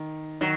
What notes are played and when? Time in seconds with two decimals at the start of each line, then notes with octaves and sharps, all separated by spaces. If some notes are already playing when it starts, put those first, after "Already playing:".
Already playing: D#3
0.41 D#3 F#3